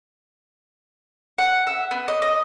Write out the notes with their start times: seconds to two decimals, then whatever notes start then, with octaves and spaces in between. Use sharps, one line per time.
1.38 F#5
1.67 E5
1.91 B3
2.08 D#5
2.22 D#5